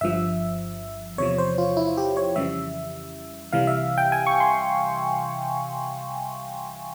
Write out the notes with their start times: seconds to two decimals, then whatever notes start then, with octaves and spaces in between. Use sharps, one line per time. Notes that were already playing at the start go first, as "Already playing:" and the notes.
0.01 G1 G2 F3 E5
1.18 E2 C3 F3 C#5
1.38 C5
1.58 F4
1.77 E4
1.97 G4
2.17 C#5
2.36 F2 C#3 E3 G3 E5
3.53 C2 C3 E3 G3 F5
3.67 E5
3.98 G5
4.12 G#5
4.27 C#6
4.40 C6